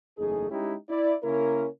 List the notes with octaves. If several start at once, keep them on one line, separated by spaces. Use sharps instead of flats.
F#1 E2 A3 D#4 G#4
G#3 C#4 D#4 E4 G4
E4 D5
C#3 A#3 C#4 E4 A#4